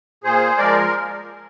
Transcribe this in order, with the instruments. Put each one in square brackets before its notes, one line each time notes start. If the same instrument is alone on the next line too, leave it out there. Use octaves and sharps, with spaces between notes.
[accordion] A#2 G#4 C5
F3 G#3 A#4 D5